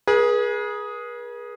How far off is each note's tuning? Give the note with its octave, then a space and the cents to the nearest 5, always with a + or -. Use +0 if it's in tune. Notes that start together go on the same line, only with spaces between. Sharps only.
G#4 +0 B4 -45